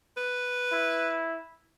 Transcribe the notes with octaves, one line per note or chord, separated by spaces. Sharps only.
B4
E4